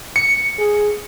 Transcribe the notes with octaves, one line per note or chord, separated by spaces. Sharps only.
C#7
G#4